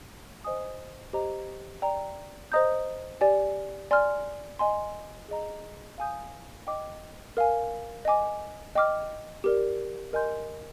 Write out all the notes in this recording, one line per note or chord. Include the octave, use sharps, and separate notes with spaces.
C5 D#5 G#5 D#6
G4 C5 D#5 A#5
D5 G5 A#5
C5 D#5 A#5 D#6 G6
G4 D5 G#5
D5 G#5 C6 F6
D#5 G#5 C6
G#4 D#5 A#5
F5 G#5 D#6 G6
D#5 G5 D6
A#4 F5 G#5
D#5 G#5 D6
D#5 G5 D6 F6
G4 A#4 D5
A#4 D#5 G#5 C6 G6